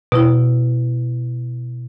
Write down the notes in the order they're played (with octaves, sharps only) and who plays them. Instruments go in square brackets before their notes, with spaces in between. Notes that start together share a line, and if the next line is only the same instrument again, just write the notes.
[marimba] B2 E4